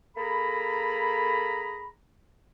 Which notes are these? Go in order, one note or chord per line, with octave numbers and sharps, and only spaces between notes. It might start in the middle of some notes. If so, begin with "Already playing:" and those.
A#3 G#4 A4 A#5 B5